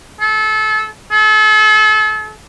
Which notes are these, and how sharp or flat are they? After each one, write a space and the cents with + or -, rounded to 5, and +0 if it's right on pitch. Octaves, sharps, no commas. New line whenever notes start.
A4 -30
A4 -40